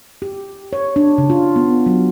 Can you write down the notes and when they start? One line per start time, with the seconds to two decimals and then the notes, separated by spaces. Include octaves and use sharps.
0.22 G4
0.73 C#5
0.96 D4
1.18 C#3
1.30 F4
1.56 B3
1.86 F#3